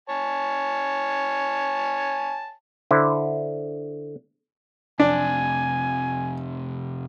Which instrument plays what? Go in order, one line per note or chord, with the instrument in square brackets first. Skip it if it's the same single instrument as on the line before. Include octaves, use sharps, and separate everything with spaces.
[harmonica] C#5 G#5 A5
[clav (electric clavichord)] D3 E4 C5
[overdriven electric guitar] F2 C3 [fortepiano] D4 [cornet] G#5